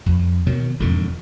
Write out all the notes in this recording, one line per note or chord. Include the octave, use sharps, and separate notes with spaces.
F2
B2 D#3 F#3
E1 F2 G#2 D3